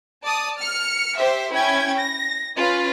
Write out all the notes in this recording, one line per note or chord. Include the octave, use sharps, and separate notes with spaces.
D5 A5 D#6
F6 C#7
G4 C5 E5
C#4 E4 G5 G#6
A#6
C#4 F4 B4